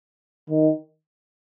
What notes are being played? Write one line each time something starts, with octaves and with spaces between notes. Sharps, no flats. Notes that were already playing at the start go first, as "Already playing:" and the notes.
D#3